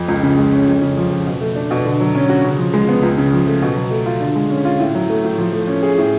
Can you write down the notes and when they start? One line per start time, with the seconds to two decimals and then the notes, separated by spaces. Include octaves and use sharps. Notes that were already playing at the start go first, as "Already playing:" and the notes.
Already playing: F2
0.08 C#2
0.23 C#3
0.38 G#3
0.53 C#4
0.67 F2
0.82 C#3
0.97 F3
1.11 F2
1.27 B2
1.41 A3
1.56 D4
1.71 B2
1.86 D3
2.01 F#3
2.15 C#4
2.29 F#4
2.45 C#3
2.58 F3
2.74 G#3
2.88 B3
3.03 C#2
3.18 C#3
3.33 F3
3.47 A3
3.62 B2
3.76 F#3
3.91 A3
4.06 F4
4.20 D3
4.36 G#3
4.50 C#4
4.65 F4
4.79 A2
4.95 F#3
5.10 A3
5.24 A2
5.38 F3
5.53 A3
5.67 C#4
5.83 G#4
5.98 A2